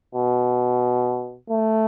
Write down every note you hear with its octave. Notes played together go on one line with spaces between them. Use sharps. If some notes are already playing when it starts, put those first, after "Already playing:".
B2
A3